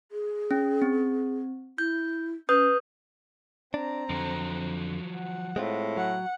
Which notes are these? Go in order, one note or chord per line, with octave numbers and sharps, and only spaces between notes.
G#4
C#4
C4
E4 G6
C#4 B4 D#6 G6
C4 D4 A#5
F2 D3 F3 F#3
F#5
A2 G#3 C4 F4
F#3 F#5